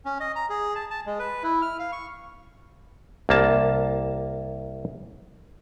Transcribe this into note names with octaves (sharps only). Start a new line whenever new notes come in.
C#4
D#5
A#5
G#4
A5
A5
G#3
B4
E4
F6
F5
C#6
C2 A#3 A5